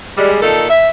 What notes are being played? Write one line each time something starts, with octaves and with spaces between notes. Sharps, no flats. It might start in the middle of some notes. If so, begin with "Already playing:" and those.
G3 G#3
A#2 D#3 D#4 A4
E5